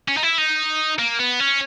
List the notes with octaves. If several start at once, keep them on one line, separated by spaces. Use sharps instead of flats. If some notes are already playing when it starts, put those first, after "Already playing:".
C#4
D#4
E4
D#4
A#3
B3
C#4